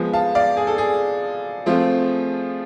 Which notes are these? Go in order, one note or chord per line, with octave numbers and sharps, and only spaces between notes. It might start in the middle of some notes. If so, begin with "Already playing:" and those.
Already playing: F3 G#3 B3
F5 A5
D5 F5
G#4
A4
G#4
F3 A3 C4 F4